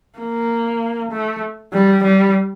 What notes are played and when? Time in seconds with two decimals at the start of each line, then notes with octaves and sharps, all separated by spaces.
0.19 A#3
1.11 A3
1.73 G3
2.04 G3